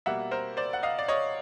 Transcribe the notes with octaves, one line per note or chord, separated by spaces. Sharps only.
B2 G3 A#3 E5 F#5
A#4 C5
C5 D5
F#5
D#5 F5
D5
C#5 D#5